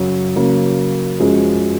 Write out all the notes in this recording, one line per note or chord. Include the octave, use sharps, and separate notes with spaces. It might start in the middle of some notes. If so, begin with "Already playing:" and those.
Already playing: F#2 C#3 F#3
C#3 F#3 A#3
F#2 F3 G#3